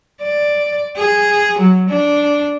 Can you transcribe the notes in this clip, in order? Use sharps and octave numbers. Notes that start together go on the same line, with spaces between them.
D5
G#4
F#3
D4